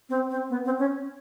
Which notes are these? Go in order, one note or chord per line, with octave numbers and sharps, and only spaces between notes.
C4
C4
B3
C4
C#4